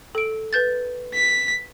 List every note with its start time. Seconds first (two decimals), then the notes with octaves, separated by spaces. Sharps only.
0.15 A4 D7
0.53 B4 G6 A6
1.14 B6